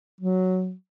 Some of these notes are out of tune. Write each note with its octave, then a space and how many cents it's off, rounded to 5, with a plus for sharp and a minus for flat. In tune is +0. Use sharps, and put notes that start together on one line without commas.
F#3 +0